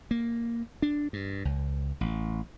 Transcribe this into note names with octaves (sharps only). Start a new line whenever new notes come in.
A#3
D4
G2
C#2
A1